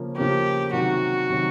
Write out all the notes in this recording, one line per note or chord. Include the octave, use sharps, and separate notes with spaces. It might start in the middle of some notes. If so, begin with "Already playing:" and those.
Already playing: C#3 F3 A#3 C#4
C#3 F3 A#3 C#4 G4
C3 D#3 F#3 F#4
C3 D#3 F#3